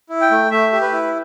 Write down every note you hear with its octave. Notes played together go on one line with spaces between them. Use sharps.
E4
G5
A3
A3 E5
G4
B4
E4